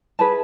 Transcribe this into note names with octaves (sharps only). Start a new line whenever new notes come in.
E4 G#4 B4 A5